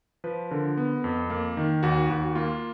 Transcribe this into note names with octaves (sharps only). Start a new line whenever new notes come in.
F3 B4
D3 A#4
B3
F2
A#3
D#3
D#2 F#4
D#2 F#4
A#3 F4